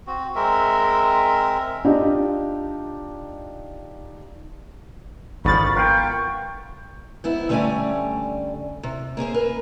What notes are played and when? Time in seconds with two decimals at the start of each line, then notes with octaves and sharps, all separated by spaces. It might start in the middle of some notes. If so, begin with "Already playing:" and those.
0.07 C4 F#4
0.35 G#3 C4 A#4 E5
1.85 D4 D#4 F4 G4 D5 D#5
5.45 G#1 D3 F3 B5 C#6 A6
5.75 B3 F4 A#4 G5 C#6
7.24 G#2 B3 E4
7.49 D3 G3 A3 C#4 D5 G#5
8.83 C3
9.17 A#3 C#4 G#4 C5
9.34 A#4 B4